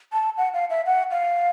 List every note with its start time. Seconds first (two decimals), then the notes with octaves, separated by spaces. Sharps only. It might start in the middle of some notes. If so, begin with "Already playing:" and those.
0.13 A5
0.38 F#5
0.54 F5
0.70 E5
0.86 F#5
1.11 F5